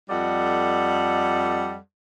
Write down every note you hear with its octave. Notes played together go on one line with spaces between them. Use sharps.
F2 G3 A4 D5 D#5 F#5